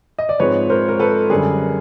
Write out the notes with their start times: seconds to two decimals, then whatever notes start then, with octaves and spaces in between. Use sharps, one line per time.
0.19 D#5
0.29 D5
0.39 G#2 F3 G#3 C4 B4 C#5
0.70 A#4 C5
0.88 A#4
1.00 A4 B4
1.30 F#2 D3 G3 G#4 A#4